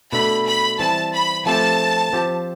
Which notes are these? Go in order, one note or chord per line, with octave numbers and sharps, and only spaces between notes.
B2 A3 D4 A4 B5
B5
E3 G3 C4 A5
B5
F3 A3 C4 G4 A5
F3 C4 G4